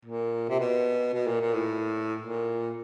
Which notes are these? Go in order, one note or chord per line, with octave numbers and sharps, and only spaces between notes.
A#2
C3
B2
B2
A#2
A#2
A2
A#2